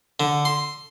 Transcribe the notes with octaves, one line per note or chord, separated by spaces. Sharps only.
D3
C6